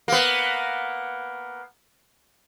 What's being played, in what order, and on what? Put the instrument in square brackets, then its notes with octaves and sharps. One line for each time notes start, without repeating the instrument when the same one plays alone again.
[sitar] A#3 B3